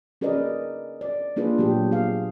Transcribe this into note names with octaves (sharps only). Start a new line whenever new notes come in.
C#4 G#4 A#4 B4 D5 D#5
D5
A#3 D4 F4 G#4 B4
A#2 F#3 G#3 B3 G4
G#4 F5